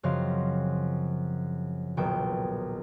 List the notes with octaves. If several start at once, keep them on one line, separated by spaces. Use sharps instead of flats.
F#2 C#3 F3 C4 D#5 F5
D#1 B1 D#3 G5 E7